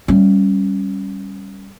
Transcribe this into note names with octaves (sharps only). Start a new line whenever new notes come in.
G3 C#4